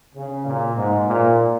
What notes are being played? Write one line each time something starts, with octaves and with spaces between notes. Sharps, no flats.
C#3
A#2
G#2
A#2